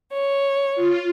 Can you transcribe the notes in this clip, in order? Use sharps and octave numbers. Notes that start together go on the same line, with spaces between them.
C#5
F4